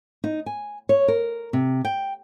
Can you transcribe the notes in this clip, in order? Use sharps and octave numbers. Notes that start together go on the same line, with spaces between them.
D#4
G#5
C#5
A#4
C3
G5